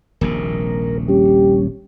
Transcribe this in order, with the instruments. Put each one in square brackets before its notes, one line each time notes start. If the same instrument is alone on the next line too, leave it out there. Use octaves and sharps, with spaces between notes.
[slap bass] D#1 A#1 C3 [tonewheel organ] A#4
[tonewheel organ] G3 C#4 [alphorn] G4